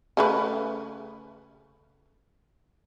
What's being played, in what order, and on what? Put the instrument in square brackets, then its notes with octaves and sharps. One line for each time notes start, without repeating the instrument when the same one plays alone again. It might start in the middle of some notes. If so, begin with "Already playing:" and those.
[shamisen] C#3 A3 B4